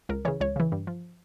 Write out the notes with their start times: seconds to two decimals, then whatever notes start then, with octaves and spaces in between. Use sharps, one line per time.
0.09 C#2 A#4
0.25 C#3 E3 C#5
0.40 C#2 C#5
0.56 C#3 E3
0.72 G2
0.87 F3